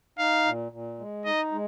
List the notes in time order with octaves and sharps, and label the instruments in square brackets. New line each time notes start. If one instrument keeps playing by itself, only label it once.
[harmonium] D#4 [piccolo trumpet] F5
[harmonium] A#2
A#2
G#3
[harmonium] D#4 [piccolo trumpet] D#5
[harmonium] G#3